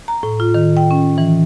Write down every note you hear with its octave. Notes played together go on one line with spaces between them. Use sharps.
A#5
A2
F4
D#3
G5
C#4
E3